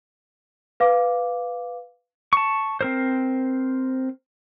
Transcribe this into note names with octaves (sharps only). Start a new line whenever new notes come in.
B4 F5 D6
A5 C#6
C4 A#4 C5